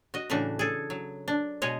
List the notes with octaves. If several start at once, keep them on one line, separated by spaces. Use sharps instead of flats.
F#4 D#5
A2 C#3 E3 D4 F#4
G#4 A4
F#3
D4
B2 G#3 C#5 D#5